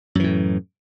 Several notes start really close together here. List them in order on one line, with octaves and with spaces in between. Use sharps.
F#2 E3 A2